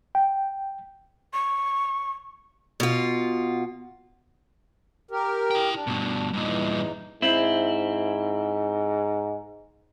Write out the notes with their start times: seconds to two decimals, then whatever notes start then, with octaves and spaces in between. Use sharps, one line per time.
0.15 G5
1.33 C#6
2.80 B2 F4
5.11 G4 A#4
5.51 E4 G5
5.74 D4
5.87 G2 B2
6.33 E2 G2 A#2 D#4
7.22 G#2 C4 E4